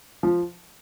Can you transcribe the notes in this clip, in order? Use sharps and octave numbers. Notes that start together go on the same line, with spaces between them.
F3